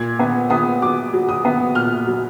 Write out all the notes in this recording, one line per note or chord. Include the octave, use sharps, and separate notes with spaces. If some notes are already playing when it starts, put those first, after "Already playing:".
Already playing: A#2 G#6
B3
B3 D#6
F#3 D6
F#3
D#6
B3
A#2 F6
F#3